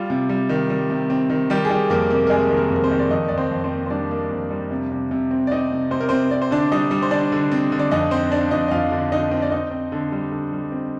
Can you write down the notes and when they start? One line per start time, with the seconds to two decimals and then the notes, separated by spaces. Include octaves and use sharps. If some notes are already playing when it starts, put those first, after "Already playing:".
Already playing: G3 F4
0.10 C3
0.29 G3
0.49 D#3
0.70 G3
0.90 C3
1.10 C4
1.30 D#3
1.50 D#3 G3 G4
1.65 G#4
1.70 D#3 G3 G4
1.90 F2 A#3 A#4
2.10 C3 A#3 A#4
2.27 A#4
2.30 G#3 G#4
2.51 D#3
2.57 A#3 A#4
2.70 F2
2.76 A#4
2.84 C4 C5
2.91 D#3
2.99 D5
3.11 F2 D#4 D#5
3.28 F2 D5
3.37 C4 C5
3.51 F2
3.64 C4 C5
3.71 A#3
3.86 C5
3.90 G3 D4 D5
4.11 A#3
4.31 F2
4.51 G3
4.71 C3
4.92 C3
5.11 C3
5.31 C4
5.47 D5
5.51 C4 D#4 D#5
5.72 C3
5.91 C3 C5
6.00 A#4
6.09 C3 C4 C5
6.31 C4 D5
6.42 C5
6.51 D3 D4 D5
6.72 G3 D#4 D#5
6.91 G3
7.02 C5
7.11 D3 D4 D5
7.32 D3
7.52 C4
7.72 D3
7.79 D5
7.91 F2 D#4 D#5
8.11 C4 C5
8.32 C4 D4 D5
8.51 F2 D#4 D#5
8.68 D#5
8.71 F2 F4 F5
8.92 D3
9.12 D3 D#4 D#5
9.31 C4
9.42 D5
9.52 C4 D#4 D#5
9.71 C4
9.92 D3
10.12 G3
10.32 D3
10.53 G3
10.72 C4